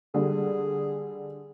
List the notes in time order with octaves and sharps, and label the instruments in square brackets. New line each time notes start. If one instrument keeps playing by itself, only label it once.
[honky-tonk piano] D3 G3 [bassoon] G#4